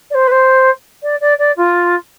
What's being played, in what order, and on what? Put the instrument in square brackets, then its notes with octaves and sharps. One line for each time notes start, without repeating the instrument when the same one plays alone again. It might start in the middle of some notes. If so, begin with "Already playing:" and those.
[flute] D5
C5
B4
C5
D5
D5
D5
F4